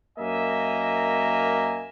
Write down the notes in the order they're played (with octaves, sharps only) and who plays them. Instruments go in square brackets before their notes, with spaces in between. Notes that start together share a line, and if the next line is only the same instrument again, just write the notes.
[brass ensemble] F#2 A#3 D#5 E5 G#5 A#5